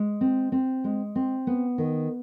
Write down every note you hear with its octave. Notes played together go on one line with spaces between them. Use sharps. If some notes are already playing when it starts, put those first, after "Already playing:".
Already playing: G#3
C4
C4
G#3
C4
B3
D#3